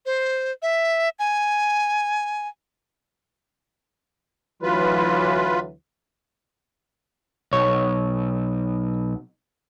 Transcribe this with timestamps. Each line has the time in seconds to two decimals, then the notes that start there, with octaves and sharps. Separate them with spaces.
0.06 C5
0.62 E5
1.19 G#5
4.63 D2 E3 F#3 F4 B4
7.53 B1 C#5